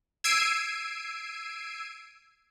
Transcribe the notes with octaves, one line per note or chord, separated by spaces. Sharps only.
E6 G#6 C7 D7 D#7